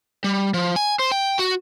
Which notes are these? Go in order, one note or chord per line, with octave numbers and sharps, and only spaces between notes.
G3
F3
G#5
C5
G5
F#4